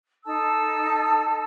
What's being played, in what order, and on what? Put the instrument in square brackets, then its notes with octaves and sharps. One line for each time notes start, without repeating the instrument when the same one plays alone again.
[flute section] D#4 A4 A5 E6